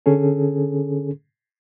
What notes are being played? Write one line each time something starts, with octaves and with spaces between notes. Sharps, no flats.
D3 C#4 G#4 A4